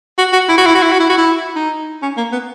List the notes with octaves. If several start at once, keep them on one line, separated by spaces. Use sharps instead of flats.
F#4
F#4
E4
F#4
E4
F#4
E4
F#4
E4
F#4
E4
D#4
C#4
A#3
B3